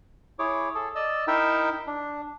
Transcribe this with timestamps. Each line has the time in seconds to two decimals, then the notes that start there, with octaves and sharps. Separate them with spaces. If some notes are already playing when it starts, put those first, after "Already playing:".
0.39 E4 G#4 C#5 D6
0.75 G#4 A4
0.95 D5 D#5 E6
1.27 D#4 E4 A#4 E5 G5 E6
1.87 D4